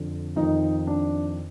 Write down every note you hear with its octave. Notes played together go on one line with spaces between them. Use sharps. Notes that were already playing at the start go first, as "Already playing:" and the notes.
Already playing: F2 D3
F2 D#3 D#4
D4